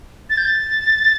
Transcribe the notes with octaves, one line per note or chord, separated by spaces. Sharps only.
A6
G6
A6